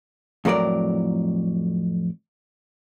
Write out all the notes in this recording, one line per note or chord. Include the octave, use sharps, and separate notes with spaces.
F2 A2 F#3 A#4 D5